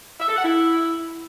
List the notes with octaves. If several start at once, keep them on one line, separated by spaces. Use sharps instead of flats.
E5
A4
F#5
E4